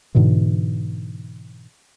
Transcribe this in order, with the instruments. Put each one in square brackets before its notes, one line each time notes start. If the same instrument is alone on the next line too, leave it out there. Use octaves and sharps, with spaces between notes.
[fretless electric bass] G#2 B2 D3 E3